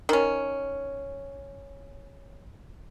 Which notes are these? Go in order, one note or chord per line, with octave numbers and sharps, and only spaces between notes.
D#3 C#4